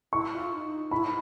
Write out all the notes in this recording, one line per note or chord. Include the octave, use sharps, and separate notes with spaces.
E4 C#6
F4
D#4
E4 B5
D#4